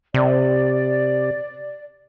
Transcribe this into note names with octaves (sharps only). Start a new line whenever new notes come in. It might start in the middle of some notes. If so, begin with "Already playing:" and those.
C3 D5